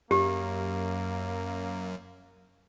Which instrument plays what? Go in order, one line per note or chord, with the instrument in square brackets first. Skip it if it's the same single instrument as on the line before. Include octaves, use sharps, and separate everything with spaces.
[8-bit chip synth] F#2 [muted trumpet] A#3 [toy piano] G4